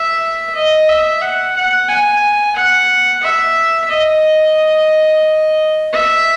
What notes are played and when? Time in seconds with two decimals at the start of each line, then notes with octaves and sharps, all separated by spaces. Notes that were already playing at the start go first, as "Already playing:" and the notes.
Already playing: E5
0.55 D#5
0.88 E5
1.21 F#5
1.56 F#5
1.88 G#5
2.56 F#5
3.23 E5
3.90 D#5
5.92 E5